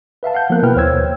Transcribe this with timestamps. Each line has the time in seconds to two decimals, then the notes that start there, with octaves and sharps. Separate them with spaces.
0.23 B4 E5 F5 A5
0.34 F5 F#5 G6
0.50 F3 A#3 B3 A#4 F#6
0.63 B2 A#3 E4 B4 G5 F6
0.76 D#2 C5 C#5 G5 E6 G#6